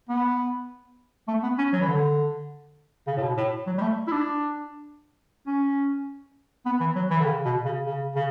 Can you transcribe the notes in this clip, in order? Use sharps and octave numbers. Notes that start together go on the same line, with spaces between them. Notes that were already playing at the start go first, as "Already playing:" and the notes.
B3
A3
B3
C#4
F#3
E3
D3
C#3
A2
B2
A2
F#3
G3
A3
E4
D4
C#4
B3
E3
F#3
E3
D3
C#3
B2
C#3
C#3
C#3